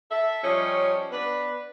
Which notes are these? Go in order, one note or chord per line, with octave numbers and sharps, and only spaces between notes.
A4 E5
F3 G3 C#4 C#5 D#5
B3 D4 B4